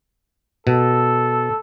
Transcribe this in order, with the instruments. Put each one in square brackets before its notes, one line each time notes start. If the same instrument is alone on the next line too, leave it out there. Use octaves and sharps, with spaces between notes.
[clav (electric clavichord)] B2 [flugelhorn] A4